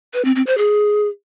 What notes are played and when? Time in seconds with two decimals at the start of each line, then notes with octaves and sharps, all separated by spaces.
0.14 B4
0.25 C4
0.36 C4
0.47 C5
0.58 G#4